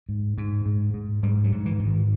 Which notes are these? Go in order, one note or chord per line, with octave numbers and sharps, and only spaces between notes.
G#2
G#2
G#2
G#2
G#2 G3
F#3
G#2
E3
G#2
D#3